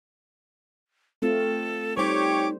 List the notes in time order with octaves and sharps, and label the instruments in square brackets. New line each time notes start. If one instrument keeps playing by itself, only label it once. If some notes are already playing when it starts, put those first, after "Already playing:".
[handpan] A3 C4 F4 [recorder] A4
[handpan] G3 C5 [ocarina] D#4 [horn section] G4 C#5 [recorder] D6